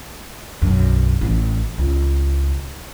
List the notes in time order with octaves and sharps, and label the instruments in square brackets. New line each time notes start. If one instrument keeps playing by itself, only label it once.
[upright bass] B1 F#2
A1
C#2